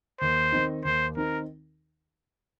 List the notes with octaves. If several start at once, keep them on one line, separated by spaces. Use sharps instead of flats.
D#2 C5
D#3 C4 D#4
D#2 C5
D#3 C4 D#4 A#4